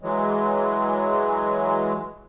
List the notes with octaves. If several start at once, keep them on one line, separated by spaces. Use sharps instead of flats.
E3 F#3 G#3